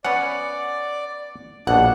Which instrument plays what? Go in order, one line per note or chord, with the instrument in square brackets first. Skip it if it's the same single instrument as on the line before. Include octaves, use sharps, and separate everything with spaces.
[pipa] B3 C#4 [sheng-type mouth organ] D5 [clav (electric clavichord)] F#5
[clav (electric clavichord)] A#1 B2 [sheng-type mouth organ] D4 [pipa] F#5